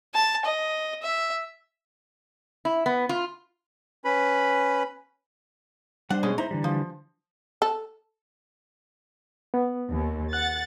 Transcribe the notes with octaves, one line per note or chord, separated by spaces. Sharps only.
A5
D#5
E5
E4
B3
F4
C#4 B4 B5
G3 D4 C5 F#5
B2 G#3 C#4
D#4 E4 C5 A#5
D3 E3 G3
F3
A4
B3
D#2
F#5 F#6 A6